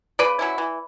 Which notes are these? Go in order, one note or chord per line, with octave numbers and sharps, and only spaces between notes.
C#3 B4 D5
F#3 C#4 E4
E3